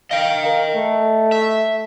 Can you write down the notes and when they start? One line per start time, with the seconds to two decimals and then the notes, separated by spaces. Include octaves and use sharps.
0.11 D#5 F5 G5
0.44 A#4
0.75 A3
1.32 E5